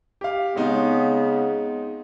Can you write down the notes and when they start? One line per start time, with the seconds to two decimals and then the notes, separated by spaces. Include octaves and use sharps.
0.21 G4 F5
0.56 C#3 G#3 B3 C4 D#4